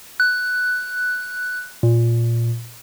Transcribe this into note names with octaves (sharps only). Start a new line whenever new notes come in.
F#6
A#2